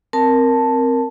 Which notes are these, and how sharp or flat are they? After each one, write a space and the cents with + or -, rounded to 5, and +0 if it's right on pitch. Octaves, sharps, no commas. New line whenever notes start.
C4 +5 A#4 +0 A5 +0